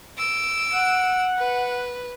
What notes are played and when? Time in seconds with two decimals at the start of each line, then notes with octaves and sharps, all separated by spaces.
0.18 E6 D7
0.73 F#5
1.38 B4